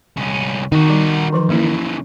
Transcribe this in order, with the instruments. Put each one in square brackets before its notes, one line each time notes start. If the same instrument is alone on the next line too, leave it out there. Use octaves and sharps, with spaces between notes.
[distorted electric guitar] C2 C#4
[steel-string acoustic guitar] D#3 [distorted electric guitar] D#4 F#4
[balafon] G3
E3 F3 C6
[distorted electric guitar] C#3 E3 [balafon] A#3 E4